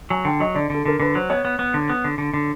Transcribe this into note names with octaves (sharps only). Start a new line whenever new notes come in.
F#3 G#5
D3 G5
F#3 D#5
D3 D5
D3 A4
D3 A#4
D3 B4
F#3 C5
B3 C#5
B3
B3
D3
B3
D3
D3
D3